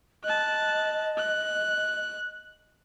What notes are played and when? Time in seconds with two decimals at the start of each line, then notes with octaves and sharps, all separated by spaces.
0.24 D#5 A5 F#6
1.18 F#6